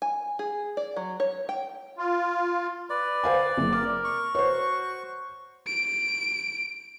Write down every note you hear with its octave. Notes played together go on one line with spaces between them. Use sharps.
G#5
G#4
D5
F#3
C#5
G5
F4
B4 D5
C5 F5 G#5
F#1
A#4 D6
C#6
F#4 C5 C#5
D7